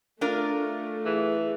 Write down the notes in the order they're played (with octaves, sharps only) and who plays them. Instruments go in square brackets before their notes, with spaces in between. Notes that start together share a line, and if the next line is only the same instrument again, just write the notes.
[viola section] A3 [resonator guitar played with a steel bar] D4 F4 A#4
[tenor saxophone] E3 [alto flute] G#4